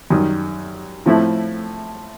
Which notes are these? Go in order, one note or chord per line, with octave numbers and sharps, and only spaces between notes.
F#2 D#3 G3
A2 F3 A3 C4 E4